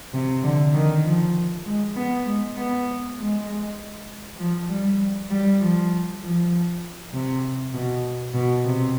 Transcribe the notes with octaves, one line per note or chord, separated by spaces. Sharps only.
C3
D3
D#3
F3
G#3
B3
G#3
B3
G#3
F3
G3
G3
F3
F3
C3
B2
B2
C3